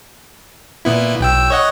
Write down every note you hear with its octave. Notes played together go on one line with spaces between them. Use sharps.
A#2 B3 E4
B1 G5 E6
C#5 D#5 F#5